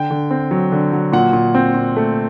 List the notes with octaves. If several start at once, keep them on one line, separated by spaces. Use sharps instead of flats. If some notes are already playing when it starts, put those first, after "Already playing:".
Already playing: D3 G5
D3
C4
F#3
D3
F#3
A#2 F#5
A#2
C4
A#2
A3